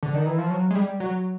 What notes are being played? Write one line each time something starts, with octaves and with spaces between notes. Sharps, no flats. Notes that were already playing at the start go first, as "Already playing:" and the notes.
D3
D#3
E3
F3
F#3
G#3
G3
F#3